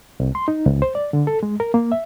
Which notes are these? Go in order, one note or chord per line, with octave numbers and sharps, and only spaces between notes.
C2
C6
D#4
C#2
C5
D5
D3
A4
G#3
A#4
A#3
E5